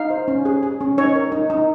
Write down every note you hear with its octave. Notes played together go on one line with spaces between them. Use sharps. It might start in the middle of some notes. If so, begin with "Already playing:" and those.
Already playing: D#4 F5
C5
C#4
G#4
G#4
C#4
D#4 C#5
A#4
D#4
D#4